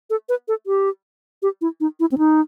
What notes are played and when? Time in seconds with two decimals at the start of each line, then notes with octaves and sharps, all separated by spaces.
0.10 A4
0.29 B4
0.48 A4
0.67 G4
1.42 G4
1.61 E4
1.80 D#4
2.00 E4
2.12 C4
2.18 D#4